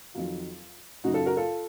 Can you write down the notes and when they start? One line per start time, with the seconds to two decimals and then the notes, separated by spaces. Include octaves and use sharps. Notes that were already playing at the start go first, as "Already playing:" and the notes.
0.14 F2 D#3 F#3 F4
1.04 F#2 C#3 F#3 D#4 F#4
1.14 F4 A4
1.25 F#4 A#4
1.37 F4 A4